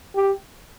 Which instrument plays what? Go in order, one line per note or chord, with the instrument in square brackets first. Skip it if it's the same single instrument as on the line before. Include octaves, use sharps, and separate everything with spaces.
[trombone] G4